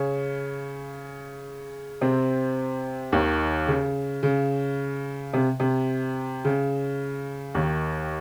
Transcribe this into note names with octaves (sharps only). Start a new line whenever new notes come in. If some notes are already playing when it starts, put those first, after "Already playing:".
Already playing: C#3 C#4
C3 C4
D#2 D#3
C#3
C#3
C3
C3
C#3
D#2 D#3